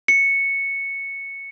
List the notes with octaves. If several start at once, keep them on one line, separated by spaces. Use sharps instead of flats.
C#7